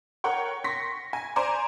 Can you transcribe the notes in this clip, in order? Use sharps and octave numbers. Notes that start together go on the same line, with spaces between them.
A#4 C#5 F#5 G5 C#6
C6 C#6 A#6 B6
G#5
C5 D5 G#5 A#5 C6 D6